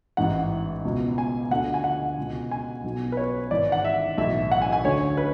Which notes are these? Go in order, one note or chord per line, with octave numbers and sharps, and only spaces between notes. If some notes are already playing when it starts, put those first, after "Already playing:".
A1 G#2 E3 F#5
C#2 B2
G#5
D2 D3 F#5
G#5
F#5
C#2 B2
G#5
B1 B2
B4
C#5
G#1 G#2 E3 D5
F#5
E5
B1 A2 E3 E5
F#5
G#5
G#5
D2 D3 C#5
B4